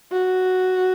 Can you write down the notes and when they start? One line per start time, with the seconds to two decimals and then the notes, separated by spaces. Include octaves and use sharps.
0.12 F#4